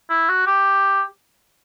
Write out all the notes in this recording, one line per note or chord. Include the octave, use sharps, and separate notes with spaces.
E4
F#4
G4